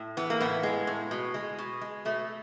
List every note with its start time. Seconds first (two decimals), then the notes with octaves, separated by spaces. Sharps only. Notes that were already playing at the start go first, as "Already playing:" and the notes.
Already playing: A2
0.17 E3 B3
0.30 A#3
0.40 A2 B3
0.63 G#3
0.87 A2
1.11 B2
1.34 G#3
1.58 B2
1.81 G#3
2.05 B2 A3